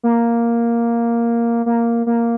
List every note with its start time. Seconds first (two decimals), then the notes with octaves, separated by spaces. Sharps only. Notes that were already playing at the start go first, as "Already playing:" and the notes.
0.03 A#3
1.66 A#3
2.06 A#3